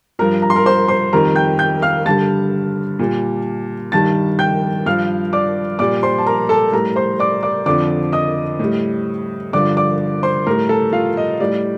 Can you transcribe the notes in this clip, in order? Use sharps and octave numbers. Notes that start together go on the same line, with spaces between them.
G2 F3 A#4 A#5
A#5
C6
A#4 A#5
C5 C6
C5 C6
F2 D#3 G3 A#4 A#5
G5 G6
G5 G6
F5 F6
G2 D3 G3 A5 A6
A#2 G3
G2 D#3 G3 A5 A6
G5 G6
G2 F3 F5 F6
D5 D6
A#2 G3 D5 D6
C5 C6
A5
A#4 A#5
A4 A5
A2 G3 A#4 A#5
C5 C6
D5 D6
D5 D6
F2 D3 F3 D5 D6
D#5 D#6
A2 G3
G2 D3 F3 D5 D6
D5 D6
C5 C6
A2 G3 A#4 A#5
A4 A5
F4 F5
D#5
A2 G3 D5